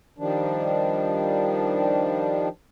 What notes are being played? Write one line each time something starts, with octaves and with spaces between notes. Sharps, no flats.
D#3 F3 G3 D4